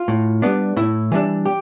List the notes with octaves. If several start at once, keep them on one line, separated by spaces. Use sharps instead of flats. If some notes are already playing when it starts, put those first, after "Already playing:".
Already playing: F4
A2
G3 B3 D4
A2 E4
E3 G3 D4
G4